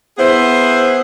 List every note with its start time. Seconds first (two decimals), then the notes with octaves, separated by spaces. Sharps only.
0.18 B3 E4 G#4 C5